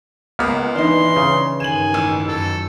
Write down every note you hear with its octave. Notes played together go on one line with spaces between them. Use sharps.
C#2 A#3 B3 F6
E3 D4 D#4 C6
C#3
G2 D#3 G#5 E7 F#7
A1 E6
F#2 A4